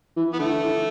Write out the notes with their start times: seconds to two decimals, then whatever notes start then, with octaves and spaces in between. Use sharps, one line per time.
0.16 E3
0.33 B3
0.39 D3 A3
0.64 E3